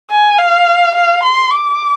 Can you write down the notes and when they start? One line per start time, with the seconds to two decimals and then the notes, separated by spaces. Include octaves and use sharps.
0.10 G#5
0.39 F5
0.95 F5
1.23 C6
1.51 D6